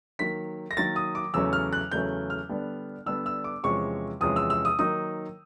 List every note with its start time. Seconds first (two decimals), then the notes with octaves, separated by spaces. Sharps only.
0.19 D#3 F#3 A#3 B6
0.71 A#6
0.77 D#3 F#3 A#3 A6
0.96 D#6
1.15 D6
1.34 E2 C#3 F#3 A3 C#4 E6
1.53 F6
1.73 F#6
1.91 E2 C#3 F#3 A3 C#4 G6
2.30 F6
2.49 D3 G3 B3 D4
3.06 D3 G3 B3 D4 E6
3.26 E6
3.44 D6
3.64 E2 C3 F3 G#3 C#4 C#6
4.21 E2 C3 F3 G#3 C#4 D#6
4.36 E6
4.50 E6
4.65 D#6
4.79 D#3 F#3 A#3 D#4 D#6